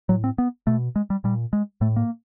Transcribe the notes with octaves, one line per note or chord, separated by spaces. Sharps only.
A2 F#3
C4
B3
B2 A3
G#3
G3
A#2 G3
G#3
A2 A3
A#3